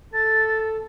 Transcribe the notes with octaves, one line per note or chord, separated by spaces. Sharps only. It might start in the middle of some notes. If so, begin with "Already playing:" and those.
A4 A6